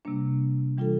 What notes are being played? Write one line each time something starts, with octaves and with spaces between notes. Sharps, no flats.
C3 G3 A#3 D4
E3 G3 D4 F4 A4